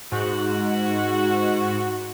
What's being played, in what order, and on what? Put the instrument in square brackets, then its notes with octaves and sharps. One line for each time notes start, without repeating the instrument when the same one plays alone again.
[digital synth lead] G#2 [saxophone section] F#4